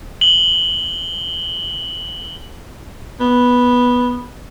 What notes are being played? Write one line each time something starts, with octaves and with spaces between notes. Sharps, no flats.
F#7 G7
B3